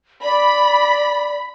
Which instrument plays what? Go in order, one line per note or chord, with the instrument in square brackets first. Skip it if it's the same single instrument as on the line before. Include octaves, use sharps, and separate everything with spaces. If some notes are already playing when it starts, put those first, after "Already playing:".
[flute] D5 [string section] B5